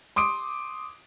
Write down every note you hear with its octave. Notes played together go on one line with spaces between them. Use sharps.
C6 D6 D#6 D7